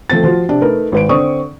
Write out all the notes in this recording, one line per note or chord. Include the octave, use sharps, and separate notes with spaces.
F3 A3 C4 A6
F3 F4 F#4
C3 D4
A3 D#4 A#4 B4
G#1 B4 D7
D3 C4 D5 C#6 D#6